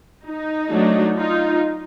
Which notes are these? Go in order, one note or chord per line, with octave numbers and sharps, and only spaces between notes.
D#4
F#3 A3 D4
D#4 F4